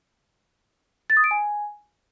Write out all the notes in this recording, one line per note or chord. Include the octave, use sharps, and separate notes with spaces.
A6
D#6
D7
G#5